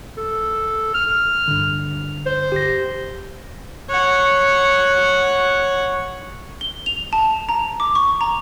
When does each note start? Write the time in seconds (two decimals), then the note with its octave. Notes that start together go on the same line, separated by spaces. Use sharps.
0.17 A4
0.94 F6
1.48 G2 D3
2.26 C5
2.52 G4 A#6
3.90 C#5 F#5
6.61 G7
6.86 F7
7.13 A5
7.49 A#5
7.80 D6
7.95 C#6
8.21 A#5